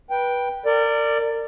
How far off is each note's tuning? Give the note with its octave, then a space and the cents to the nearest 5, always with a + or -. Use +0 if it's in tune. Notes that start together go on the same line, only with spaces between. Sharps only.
B4 -20 G5 +0
A#4 -30 D5 +5